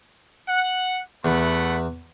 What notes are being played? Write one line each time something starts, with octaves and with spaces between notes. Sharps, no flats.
F#5
E2 A3 F#5 B5